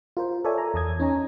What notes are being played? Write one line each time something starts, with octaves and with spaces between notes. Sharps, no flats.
F4 A#4 C5
A4 A#4 C#5 D5 E5 G#5
A#5
E2 A5 D#6 G#6
C#4 D#4 C#5 G#5 A#5